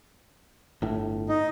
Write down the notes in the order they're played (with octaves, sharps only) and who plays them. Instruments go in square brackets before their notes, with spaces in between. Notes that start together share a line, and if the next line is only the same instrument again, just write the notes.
[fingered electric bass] G1 A2
[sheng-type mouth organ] D#4